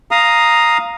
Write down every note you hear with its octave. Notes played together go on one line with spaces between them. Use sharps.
F5 A#5 D#6